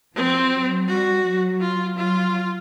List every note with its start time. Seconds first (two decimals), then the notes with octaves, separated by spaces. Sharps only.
0.15 F3 C4
0.52 F#3
0.88 G3 F#4
1.25 F#3
1.60 F4
1.97 F#3 F4